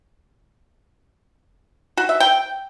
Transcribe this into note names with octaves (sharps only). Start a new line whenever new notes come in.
F#4
E5
G5